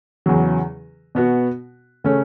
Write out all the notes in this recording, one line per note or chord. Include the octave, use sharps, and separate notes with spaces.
E2 C#3 F#3
B2 B3 F#4
C#3 A3 C#4